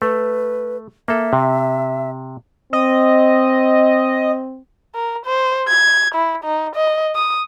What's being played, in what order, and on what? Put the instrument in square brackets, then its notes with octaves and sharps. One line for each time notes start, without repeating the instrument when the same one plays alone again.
[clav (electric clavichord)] A3 [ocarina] B4
[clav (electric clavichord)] A#3 A4 [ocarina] E5
[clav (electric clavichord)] C3
[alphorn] C4 [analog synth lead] D#5
[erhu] A#4
C5
G#6
E4
D#4
D#5
D#6